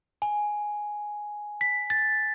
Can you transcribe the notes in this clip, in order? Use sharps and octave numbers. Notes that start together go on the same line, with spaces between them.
G#5
B6
A6